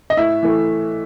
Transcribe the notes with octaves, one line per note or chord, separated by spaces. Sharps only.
D#5
A2 E5
E3 A3